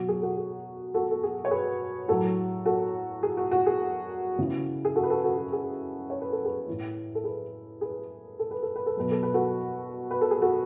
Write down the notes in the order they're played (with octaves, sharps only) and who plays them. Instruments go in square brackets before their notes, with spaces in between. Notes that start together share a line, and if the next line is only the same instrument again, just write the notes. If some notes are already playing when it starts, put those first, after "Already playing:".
Already playing: [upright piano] B2 F#3 F#4
G#4
F#4 A4
G#4
F#4 A4
A4
G#4
C#5
G#4 B4
A2 F#3 F#4 A4
F#4 A4
G#4
F#4
F#4
G#4
C#3 E3
G#4
F#4 A4
B4
F#4 A4
F#4 A4
F#4
G#4
C#5
B4
A4
G#4 B4
A2 E3
A4
G#4 B4
G#4 B4
A4
B4
A4
B4
A4
B2 F#3 B4
A4
B4
F#4 A4
B4
A4
G#4
F#4 A4